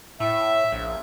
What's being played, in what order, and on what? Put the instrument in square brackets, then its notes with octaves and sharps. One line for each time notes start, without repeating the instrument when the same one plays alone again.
[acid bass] A2 [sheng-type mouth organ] E5
[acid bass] A#1